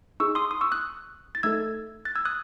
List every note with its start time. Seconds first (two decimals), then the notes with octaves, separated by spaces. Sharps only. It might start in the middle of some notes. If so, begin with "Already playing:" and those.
0.20 D#4 G#4 C#6 E6
0.35 C6 D#6
0.51 C6 D#6
0.61 C#6 E6
0.71 D#6 F#6
1.35 A6
1.43 A3 D#4 A4 E6 G#6
2.05 F#6 A6
2.15 E6 G#6
2.25 D#6 F#6